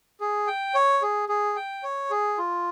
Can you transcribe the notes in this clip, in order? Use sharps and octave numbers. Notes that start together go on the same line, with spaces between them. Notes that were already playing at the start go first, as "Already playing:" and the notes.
G#4
G5
C#5
G#4
G#4
G5
C#5
G#4
F4